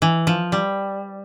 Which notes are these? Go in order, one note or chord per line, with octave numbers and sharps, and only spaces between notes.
E3
F3
G3